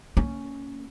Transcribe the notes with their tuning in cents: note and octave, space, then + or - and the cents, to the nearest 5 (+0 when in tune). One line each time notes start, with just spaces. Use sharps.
A#3 -20 C#4 +5